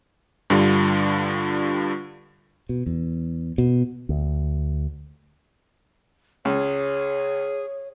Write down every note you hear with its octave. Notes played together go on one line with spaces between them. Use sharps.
G2 D3 G3 F4
B2
E2
B2
D2
C#2 G#4 C#5